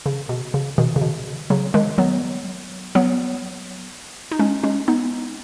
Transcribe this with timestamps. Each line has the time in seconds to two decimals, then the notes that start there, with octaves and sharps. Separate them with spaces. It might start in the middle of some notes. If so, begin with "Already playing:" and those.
0.06 C#3
0.29 B2
0.54 C#3
0.78 B2 D#3
0.96 C#3
1.02 B2
1.50 C#3 F#3
1.74 D#3 G#3
1.98 F#3 B3
2.95 F#3 B3
4.31 D#4
4.39 G#3 C#4
4.63 G#3 C#4
4.88 B3 D#4